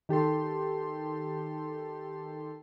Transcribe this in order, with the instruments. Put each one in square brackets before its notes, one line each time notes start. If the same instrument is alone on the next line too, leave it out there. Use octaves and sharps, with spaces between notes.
[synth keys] D#3 G4 A4 C6